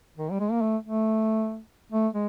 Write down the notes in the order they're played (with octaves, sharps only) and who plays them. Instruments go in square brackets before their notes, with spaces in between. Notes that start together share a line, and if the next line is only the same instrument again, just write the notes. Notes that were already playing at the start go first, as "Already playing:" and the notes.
[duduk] D#3
G3
G#3
A#3
A3
A3
A3
G#3